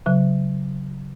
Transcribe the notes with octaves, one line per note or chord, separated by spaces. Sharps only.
C#3 F#3